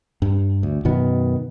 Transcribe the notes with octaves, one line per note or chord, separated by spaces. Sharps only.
G2
D2
F#2 B2 D#3 B3